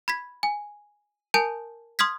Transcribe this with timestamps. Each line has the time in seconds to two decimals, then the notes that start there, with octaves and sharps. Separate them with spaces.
0.08 B5 G#6 B6
0.43 G#5
1.34 A#4 G#5 A5 G6 D7
1.99 C6 D#6 F6 G#6 B6